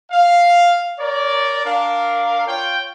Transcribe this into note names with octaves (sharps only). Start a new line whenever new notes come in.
F5
A#4 C#5 D5
D4 A#4 F5
F4 C#5 G5